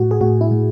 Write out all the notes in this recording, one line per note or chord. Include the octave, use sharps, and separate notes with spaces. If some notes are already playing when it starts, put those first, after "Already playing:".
Already playing: A2 F#4
G#4
A2 F#4
E4
A2